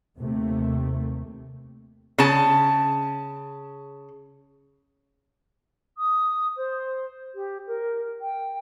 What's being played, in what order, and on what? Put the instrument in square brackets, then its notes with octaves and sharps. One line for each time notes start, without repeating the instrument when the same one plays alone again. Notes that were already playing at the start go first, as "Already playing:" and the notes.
[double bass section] D#2 C3 A3
[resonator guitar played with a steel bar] C#3 A5
[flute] D#6
C5
G4
A#4
G5